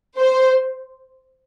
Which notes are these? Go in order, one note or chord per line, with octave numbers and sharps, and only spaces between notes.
C5